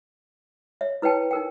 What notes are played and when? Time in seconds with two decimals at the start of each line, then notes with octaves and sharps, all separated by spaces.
0.81 C#5 E5
1.02 E4 B4 C#5 G5 A5
1.31 D#4 A#4 G5